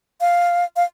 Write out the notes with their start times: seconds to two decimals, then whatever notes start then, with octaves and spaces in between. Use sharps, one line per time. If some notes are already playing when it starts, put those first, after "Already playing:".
0.21 F5
0.76 F5